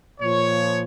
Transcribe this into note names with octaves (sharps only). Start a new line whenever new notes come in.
A#2 F3 C#5